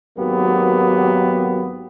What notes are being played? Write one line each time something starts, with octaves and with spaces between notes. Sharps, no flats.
G#1 F#3 A#3 B3 G4